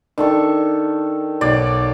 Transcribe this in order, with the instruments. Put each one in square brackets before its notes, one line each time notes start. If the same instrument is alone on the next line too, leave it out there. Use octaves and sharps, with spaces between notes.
[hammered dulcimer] D#3 A4 C#6 [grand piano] D4
[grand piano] B1 [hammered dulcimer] D5